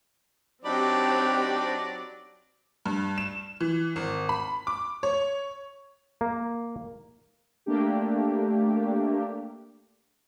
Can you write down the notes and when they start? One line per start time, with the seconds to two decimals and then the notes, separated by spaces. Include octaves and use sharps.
0.65 F#3 C4 D4 D#4 G4 D5 B5
2.86 G2
3.18 E7
3.61 E3
3.96 G#1
4.29 B5
4.67 D6
5.03 C#5
6.21 A#3
7.66 A3 A#3 D4 G4